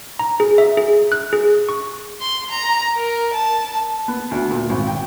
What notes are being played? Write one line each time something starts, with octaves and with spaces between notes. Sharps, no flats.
A#5
G#4
E5
G#4
F#6
G#4
C#6
C6
A#5
A#4
A5
B3
D2
A#2
G#1
G5